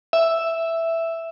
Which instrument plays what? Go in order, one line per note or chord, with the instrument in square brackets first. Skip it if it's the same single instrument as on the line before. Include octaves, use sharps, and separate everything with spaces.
[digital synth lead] E5